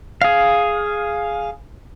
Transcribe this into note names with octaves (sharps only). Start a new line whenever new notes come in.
G#4 F5